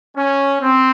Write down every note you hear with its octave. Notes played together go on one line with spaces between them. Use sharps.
C#4
C4